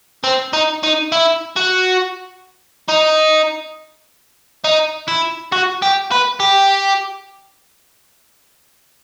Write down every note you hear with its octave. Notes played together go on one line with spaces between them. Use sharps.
C4
D#4
D#4
E4
F#4
D#4
D#4
E4
F#4
G4
B4
G4